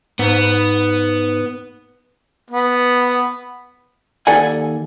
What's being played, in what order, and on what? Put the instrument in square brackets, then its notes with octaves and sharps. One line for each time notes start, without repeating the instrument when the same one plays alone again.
[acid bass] G#2 [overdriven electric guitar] B3
[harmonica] B3
[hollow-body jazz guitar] D#2 A4 D5 F#5 G#5